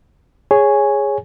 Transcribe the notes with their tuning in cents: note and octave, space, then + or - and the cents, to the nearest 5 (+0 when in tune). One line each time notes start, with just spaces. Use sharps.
G#4 -5 C#5 +0 G#5 +0